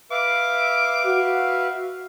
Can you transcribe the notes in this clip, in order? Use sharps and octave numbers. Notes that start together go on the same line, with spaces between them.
B4 E5 F5 D6
F#4